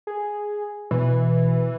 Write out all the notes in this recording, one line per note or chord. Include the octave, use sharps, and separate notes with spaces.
G#4
B2 E3